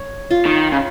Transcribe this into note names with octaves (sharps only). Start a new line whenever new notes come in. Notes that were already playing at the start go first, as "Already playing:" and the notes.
Already playing: C#5
F4
D#3
C#3